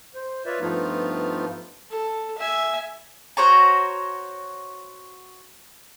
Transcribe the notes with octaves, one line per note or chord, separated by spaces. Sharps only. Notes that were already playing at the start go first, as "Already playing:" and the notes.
C5
F4 B4 C#5 D5 E5
G2 F3 A3 B3 D#4 F4
A4
E5 G#5
F#4 C5 C#5 A#5